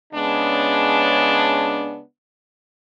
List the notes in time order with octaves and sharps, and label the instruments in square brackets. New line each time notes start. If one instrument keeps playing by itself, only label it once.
[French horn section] C#3 G#3 B3 C#4 D4